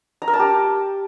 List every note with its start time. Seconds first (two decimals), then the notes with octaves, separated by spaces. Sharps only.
0.22 A#5
0.28 A#4
0.34 A5
0.39 G4